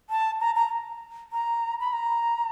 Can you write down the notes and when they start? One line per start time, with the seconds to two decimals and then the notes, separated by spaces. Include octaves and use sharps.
0.10 A5
0.41 A#5
0.56 A#5
1.32 A#5
1.80 B5
1.93 A#5